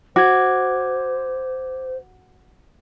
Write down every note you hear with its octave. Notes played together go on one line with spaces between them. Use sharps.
F#4 C5 D6 G#6